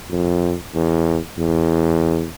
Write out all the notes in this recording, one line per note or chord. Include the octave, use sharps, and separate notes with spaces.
F2
E2
E2